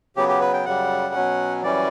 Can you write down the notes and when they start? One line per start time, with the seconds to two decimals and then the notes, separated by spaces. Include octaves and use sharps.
0.16 C#3 F#3 B3 G4
0.29 G4
0.41 B4
0.53 G5
0.65 F#2 C#3 G3 F#5
1.14 B2 F#3 C#4
1.63 F#2 E3 G3 C#4 D5